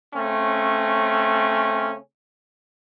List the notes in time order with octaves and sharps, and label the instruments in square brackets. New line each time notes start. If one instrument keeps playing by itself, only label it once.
[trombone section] C#3 A3 C4 C#4